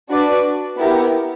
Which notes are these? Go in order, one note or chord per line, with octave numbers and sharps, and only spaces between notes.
D4 F#4 B4 D5
B3 E4 G4 A#4